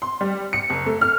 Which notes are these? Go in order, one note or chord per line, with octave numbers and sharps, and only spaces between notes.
C6
G3
C#7
F#1
A3
F6